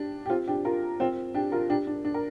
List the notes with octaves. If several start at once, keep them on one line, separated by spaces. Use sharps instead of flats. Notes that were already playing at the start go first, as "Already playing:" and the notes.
Already playing: D4 G4
G4
C4 F4
D4 G4
F4 A#4
C4 F4
D4 G4
F4 A#4
D4 G4
D4
D4
A#4